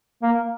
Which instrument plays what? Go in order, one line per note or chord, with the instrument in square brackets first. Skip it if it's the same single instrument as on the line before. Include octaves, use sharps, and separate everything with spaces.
[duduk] A#3